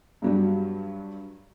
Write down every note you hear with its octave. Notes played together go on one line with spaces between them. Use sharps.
G2 F#3 G3